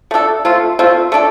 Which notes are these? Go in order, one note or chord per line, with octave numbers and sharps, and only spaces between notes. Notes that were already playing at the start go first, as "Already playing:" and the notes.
A3 D4 A4
A3 C4 F4
A3 C4 F4
A3 D4 A4